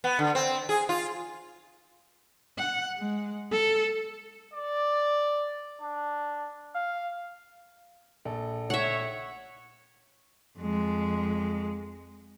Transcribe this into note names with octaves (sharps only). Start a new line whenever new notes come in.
B3
D3
C4
G#4
F4
F#5
G#3
A4
D5
D4
F5
A#1 A4
C#5 E5 F#5
F2 G#3